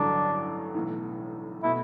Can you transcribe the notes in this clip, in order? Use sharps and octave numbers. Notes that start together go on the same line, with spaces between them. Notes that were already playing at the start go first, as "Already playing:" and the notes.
Already playing: A1 G2 D3 F#3 D4
B1 A2 E3
B2 A3 E4